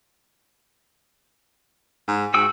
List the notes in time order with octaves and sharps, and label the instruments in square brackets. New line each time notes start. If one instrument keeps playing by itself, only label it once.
[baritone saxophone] G#2
[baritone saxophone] G#2 [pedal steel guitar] F#4 G5 E6